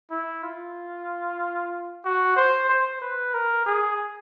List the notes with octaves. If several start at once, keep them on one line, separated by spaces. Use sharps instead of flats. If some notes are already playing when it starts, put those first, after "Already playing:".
E4
F4
F#4
C5
C5
B4
A#4
G#4